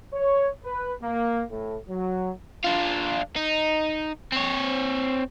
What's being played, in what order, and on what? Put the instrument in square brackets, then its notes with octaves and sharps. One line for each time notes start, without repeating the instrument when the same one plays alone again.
[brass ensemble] C#5
B4
A#3
A2
F#3
[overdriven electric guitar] D4 F4
D#4
C4 C#5